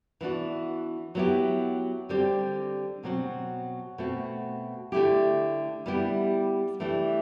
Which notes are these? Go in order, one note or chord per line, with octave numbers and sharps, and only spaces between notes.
E3 B3 D4 F#4
F#3 B3 E4 G4
D3 G3 C4 G4
B2 F#3 C4 F#4
B2 A3 C4 F#4
D3 A3 E4 G4
G3 B3 E4 G4
E3 A3 D4 G4